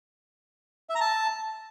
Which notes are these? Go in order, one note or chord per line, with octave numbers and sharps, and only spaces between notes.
E5
A#5
A5